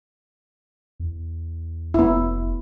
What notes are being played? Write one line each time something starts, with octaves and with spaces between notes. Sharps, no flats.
E2
F1 B3 E4